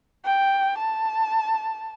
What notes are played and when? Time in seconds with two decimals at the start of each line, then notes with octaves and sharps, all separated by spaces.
0.25 G5
0.78 A5